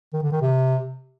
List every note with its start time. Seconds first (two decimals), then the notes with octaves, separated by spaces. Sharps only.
0.14 D#3
0.23 D3
0.32 D#3
0.42 C3